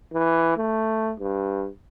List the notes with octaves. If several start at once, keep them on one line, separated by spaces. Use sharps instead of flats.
E3
A3
G2